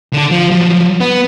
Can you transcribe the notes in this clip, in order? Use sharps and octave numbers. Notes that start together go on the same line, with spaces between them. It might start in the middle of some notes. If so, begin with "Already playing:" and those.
D3 A4
F3 F4
F3 F#3
B3